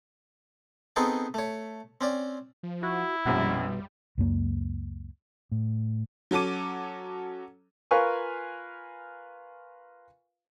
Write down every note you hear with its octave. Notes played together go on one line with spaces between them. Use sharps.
B3 C4 D#4 G#4 A4 G5
A3 C#5
C4 C#4 D5
F3
E4 F#4
A#1 F#2 B2 G3 F#4
C#2 F#2 A#3
A2
F#3 C#4 A4 D6 D#7
F4 A#4 B4 F5 G#5 C#6